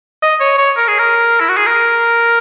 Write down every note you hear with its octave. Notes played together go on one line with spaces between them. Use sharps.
D#5
C#5
C#5
A#4
G#4
A#4
E4
F#4
G#4
A#4